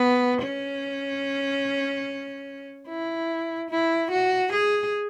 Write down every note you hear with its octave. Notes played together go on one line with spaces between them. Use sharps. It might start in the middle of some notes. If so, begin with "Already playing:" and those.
Already playing: B3
C#4
E4
E4
F#4
G#4